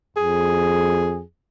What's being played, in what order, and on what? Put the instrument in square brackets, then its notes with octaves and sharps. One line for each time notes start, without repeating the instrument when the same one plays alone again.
[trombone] F2 [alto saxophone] G#4